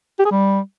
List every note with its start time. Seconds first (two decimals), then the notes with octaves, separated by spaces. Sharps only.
0.19 G4
0.25 G#4
0.31 G3